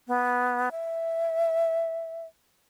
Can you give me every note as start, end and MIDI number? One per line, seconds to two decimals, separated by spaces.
0.08 0.69 59
0.71 2.26 76